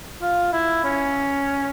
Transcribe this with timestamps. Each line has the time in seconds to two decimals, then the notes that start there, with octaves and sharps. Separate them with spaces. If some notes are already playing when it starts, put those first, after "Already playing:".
0.22 F4
0.52 E4
0.84 C#4